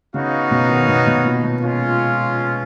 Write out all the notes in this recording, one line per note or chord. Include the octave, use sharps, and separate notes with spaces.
C#3 B3 D#4 F#4 C#5 F5
B2
D#3
B2
B2
A#2
B2
G#3 C#4 F4